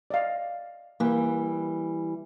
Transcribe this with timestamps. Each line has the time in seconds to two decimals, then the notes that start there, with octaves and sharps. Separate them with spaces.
0.10 D5 D#5 F5
1.00 E3 G3 A#3